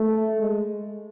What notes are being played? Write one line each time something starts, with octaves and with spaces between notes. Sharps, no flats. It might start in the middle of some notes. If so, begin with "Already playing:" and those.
Already playing: A3
G#3